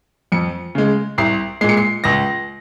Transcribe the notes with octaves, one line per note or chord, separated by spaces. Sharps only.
F2 C#7
C#3 G#3
C2 C7
A#2 G#3 C7
C#7
C7
C#2 A#6